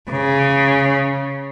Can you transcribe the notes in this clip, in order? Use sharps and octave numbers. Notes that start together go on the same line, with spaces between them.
C#3